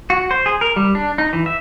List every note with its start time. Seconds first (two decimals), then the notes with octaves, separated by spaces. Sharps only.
0.10 F#4
0.31 C5
0.46 G#4
0.61 A#4
0.76 G3
0.95 D4
1.18 D#4
1.33 E3
1.46 E5